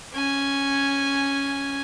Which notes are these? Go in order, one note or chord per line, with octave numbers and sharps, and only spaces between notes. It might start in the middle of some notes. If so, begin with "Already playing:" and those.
C#4 G#5